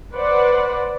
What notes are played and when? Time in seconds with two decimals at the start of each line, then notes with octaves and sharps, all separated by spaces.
0.13 B4 C5 D5 F#5